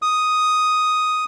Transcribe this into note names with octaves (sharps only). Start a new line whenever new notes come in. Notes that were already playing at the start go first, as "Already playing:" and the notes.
D#6